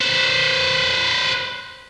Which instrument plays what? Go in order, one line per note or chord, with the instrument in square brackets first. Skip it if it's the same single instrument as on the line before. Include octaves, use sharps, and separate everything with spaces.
[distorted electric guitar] B4 C5